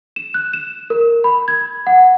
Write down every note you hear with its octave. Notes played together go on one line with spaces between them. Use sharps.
E7
F#6
E7
A#4
B5
G#6
F#5